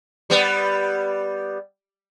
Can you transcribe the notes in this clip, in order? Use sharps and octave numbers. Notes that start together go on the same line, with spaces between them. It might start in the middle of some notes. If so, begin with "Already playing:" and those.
G3 B3